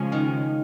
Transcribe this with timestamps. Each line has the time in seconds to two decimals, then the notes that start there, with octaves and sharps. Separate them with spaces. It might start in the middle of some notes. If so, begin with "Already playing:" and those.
Already playing: C#3 F3 G#3 C#4
0.12 D#3